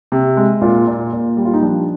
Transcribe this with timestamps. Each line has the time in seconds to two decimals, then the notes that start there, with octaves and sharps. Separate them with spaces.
0.12 C3
0.37 G#3
0.61 A#2 F4
0.87 A#2
1.13 A#2
1.37 G3
1.45 F4
1.53 D#4
1.62 F3 D4